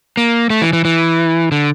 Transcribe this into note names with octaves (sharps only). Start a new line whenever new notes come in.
A#3
A3
E3
E3
E3
D3